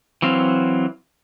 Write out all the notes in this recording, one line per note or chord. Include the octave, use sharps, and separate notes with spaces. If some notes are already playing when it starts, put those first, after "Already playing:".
E3 F#3 C4 F5